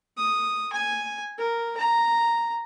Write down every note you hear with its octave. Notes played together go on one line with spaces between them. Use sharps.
D#6
G#5
A#4
A#5